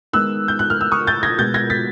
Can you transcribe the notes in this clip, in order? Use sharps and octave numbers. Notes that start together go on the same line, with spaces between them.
D#3 G#3 B3 D#4 E6 F#6
G6
F#6
F6
E6
C#6 D#6
G6 A6
G#6 A#6
B2 G#3 B3 G6 A6
G#6 A#6
A6 B6